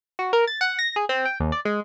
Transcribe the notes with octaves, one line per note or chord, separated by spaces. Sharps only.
F#4
A#4
A6
F#5
A#6
G#4
C4
G5
D#2
D5
G#3